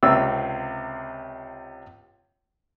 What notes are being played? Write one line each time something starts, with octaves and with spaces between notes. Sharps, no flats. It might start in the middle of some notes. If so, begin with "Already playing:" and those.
C#2 C3 E6